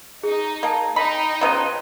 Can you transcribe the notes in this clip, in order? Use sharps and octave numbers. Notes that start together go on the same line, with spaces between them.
D#4 G#4
A#3 D#5 A5
D#4 G5 B5
C#3 F3 B3 A#5 D#7